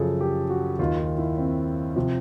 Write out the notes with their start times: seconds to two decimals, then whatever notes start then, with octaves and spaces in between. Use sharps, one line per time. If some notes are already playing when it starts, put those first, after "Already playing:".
Already playing: F#2 C#3 F3 G#4 A4
0.21 G4
0.50 F#4
0.79 D#2 D#3 F4
0.99 F4
1.18 E4
1.38 C4
1.96 C3 F3